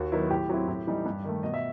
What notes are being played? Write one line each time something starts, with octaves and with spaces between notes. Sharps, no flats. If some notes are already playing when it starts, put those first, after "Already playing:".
Already playing: D#2 F#4
D#3 F#3 B3 E4
A2 G4
F#3 C4 E4
A2
E3 G3 D#4
G2
D#3 A3
B2 D#5
E5